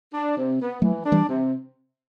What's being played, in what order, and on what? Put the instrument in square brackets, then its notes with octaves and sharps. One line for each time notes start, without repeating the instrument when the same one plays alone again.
[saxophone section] D4
C3
B3
[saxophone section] E3 [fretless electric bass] F#3 A3
[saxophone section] D4
[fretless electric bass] E3 G3
[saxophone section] C3